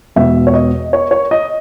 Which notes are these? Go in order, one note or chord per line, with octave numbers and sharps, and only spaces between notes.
E2 B2 G#3 B3 E5
C#5
D#5
C#5
C#5
D#5